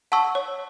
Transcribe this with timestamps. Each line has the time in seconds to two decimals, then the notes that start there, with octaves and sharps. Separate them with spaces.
0.12 F#5 A5 C#6 E6
0.35 C#5